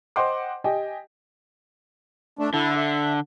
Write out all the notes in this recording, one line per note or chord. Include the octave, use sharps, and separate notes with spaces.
C5 D#5 F#5 G5 C6 D6
G4 D#5 G5 G#5
A3 D4
D3 E4 A4
E5